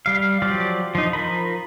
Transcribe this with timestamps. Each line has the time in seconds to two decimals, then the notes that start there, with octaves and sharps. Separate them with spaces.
0.06 G3 F5
0.42 F3 F#3 G4 D5
0.95 F3 D#4
1.13 F3 A#4 B5